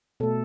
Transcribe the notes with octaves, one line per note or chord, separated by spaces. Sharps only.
B2 A3 A4